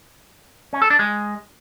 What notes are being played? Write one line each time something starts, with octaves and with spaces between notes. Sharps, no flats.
C#4
A4
D4
G#3